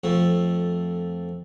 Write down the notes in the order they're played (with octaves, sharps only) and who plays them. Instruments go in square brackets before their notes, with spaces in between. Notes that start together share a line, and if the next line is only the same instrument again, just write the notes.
[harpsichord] F2 A3